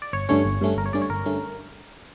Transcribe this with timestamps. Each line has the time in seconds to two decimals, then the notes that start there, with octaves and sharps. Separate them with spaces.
0.02 D5
0.13 G1 C#5
0.29 G2 D3 A3 C#4 C#5
0.45 G1
0.61 G2 D3 A3 C#4
0.77 G1 A#4
0.86 C#5
0.93 G2 D3 A3 C#4 D5
1.02 C#5
1.09 G1 A#4
1.26 G2 D3 A3 C#4